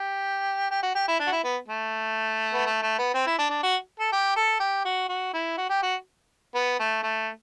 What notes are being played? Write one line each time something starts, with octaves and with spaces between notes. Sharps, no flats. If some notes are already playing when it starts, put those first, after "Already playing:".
Already playing: G4
G4
F#4
G4
E4
D4
F#4
E4
B3
A3
B3
A3
A3
B3
C4
E4
D4
D4
F#4
A4
G4
A4
G4
F#4
F#4
E4
F#4
G4
F#4
B3
A3
A3